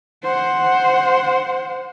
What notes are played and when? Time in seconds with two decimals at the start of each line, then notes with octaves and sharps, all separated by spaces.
0.23 C5 F#5